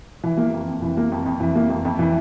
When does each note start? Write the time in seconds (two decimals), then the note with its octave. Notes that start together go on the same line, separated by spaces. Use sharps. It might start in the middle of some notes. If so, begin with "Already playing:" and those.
0.24 E3
0.37 A#3
0.53 F2
0.67 F2
0.82 E3
0.97 A#3
1.12 F2
1.26 F2
1.40 E3
1.55 A#3
1.69 F2
1.85 F2
1.99 E3